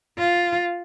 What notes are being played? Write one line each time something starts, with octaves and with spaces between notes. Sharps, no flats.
F4